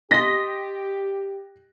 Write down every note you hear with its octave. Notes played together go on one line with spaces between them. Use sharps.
G4 D#5 C6 A#6 B6